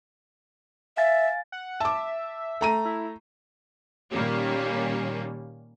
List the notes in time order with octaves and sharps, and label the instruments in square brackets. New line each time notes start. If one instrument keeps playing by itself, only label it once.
[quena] E5 [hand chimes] F5 G#5 A6
[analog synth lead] F#5
[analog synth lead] E5 [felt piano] A5 D6
[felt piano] A3 A#5 D#7
[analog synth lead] E4
[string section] A#2 D#3 G3 A#3 C#4